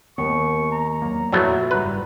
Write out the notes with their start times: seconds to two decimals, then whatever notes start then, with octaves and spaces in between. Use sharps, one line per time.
0.18 D#2 B3 C#6
0.72 A#5
1.02 E2 F#3 A#3
1.33 F2 A#2 F#3 A3 B3 E4 F#4
1.71 F#1 G#2 G3 B4 A#5